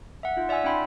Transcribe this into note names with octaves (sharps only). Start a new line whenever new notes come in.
E5 F#5
D#4 F4
D5 E5 F#5 G#5 E6
C#4 D#4 F#5 G5 B5 C6